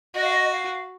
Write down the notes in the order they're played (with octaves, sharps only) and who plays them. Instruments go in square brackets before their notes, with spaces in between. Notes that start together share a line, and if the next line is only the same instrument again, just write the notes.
[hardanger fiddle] F#4 [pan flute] D#5
[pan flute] F5
D#5
F5